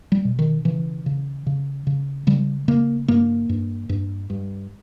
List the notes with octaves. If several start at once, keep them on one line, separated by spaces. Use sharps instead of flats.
G3
B2
D#3
C#3 E3
C#3
C#3
C#3
C#3 G3
C#3 A#3
G2 A#3
G2
G2
G2